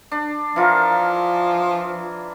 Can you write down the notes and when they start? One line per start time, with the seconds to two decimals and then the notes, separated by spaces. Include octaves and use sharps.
0.12 D4
0.56 E3 F3 F4 A#4